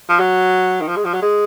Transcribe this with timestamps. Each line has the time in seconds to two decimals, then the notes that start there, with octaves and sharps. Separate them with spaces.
0.09 F3
0.19 F#3
0.81 D#3
0.88 F3
0.96 G#3
1.04 F3
1.14 F#3
1.22 G#3